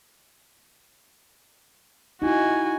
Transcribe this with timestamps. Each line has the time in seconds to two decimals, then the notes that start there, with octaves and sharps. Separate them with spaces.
2.22 D#4 E4 F#4 G#5